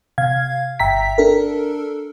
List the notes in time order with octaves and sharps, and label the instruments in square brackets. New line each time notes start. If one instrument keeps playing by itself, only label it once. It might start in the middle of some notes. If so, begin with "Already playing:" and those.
[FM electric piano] C3 F5 G#6
G1 E5 G5 A#5 B6
D4 A4 A#4